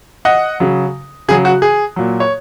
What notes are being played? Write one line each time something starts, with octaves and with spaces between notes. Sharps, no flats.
D#5 F#5
C#3 F#3
C#3 F#3 G#4
F#4
G#4
A#2 F#3
C#5